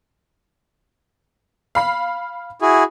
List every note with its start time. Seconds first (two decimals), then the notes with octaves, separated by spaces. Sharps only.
1.75 F5 B5 C7
2.62 E4 F#4 G#4